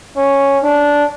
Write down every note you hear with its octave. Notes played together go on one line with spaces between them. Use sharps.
C#4
D4